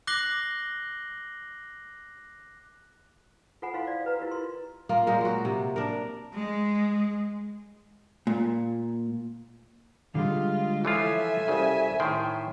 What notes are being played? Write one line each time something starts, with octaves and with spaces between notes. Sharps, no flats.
D6 F#6 A#6 C7 F#7 G7
F4 A4 C5 F#5 G#5 B5
E4 C5 D#5 F5 C6
D5 F5
F#4 B4 A#5
E4 F4 G4 A#4
E4 A#5 C6
A#3 F4
A#2 G#3 A#4 C5
F#3 F#4
C3
D4 A#4
G#3
A#2
D3 G3 G#3 F4
E3 F3 F4 A4 C#5 E5 G#5
C2 C#3
A2 D#3 G5 C6